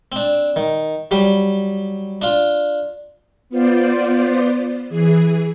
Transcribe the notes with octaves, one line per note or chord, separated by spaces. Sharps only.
C4 D4
D#3
F#3 G3 G4
D4 F4
B3 F4 C5 D5
E3 G#4